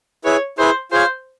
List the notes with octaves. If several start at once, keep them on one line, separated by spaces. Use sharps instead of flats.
E4 G#4 B4 C#5
E4 G#4 B4 C5
F4 G#4 C5 C#5 F5